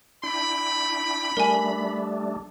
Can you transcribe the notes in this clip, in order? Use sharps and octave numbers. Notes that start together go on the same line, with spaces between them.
D4 E4 G5 B5
G3 A3 D4 A#4 G#5